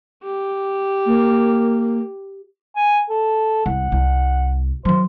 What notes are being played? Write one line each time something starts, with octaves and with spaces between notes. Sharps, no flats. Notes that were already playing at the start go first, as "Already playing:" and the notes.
G4
A#3
G#5
A4
C2 F#5
C2
D#3 F#3 C5